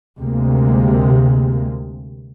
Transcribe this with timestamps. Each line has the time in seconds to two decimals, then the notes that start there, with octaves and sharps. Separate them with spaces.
0.19 D2 C3 G#3 A#3